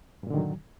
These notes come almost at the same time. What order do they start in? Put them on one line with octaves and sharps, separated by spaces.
G2 A#2 D3 D#3 F#3